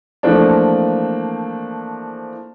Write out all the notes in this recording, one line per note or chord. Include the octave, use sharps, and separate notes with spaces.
E3 F3 A3 A#3 C4 D4